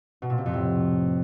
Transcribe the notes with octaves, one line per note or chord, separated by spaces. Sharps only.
B2
A#2
C3
F2
A2